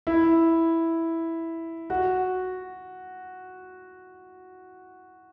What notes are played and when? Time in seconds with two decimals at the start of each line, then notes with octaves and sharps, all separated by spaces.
0.07 E4
1.90 F#4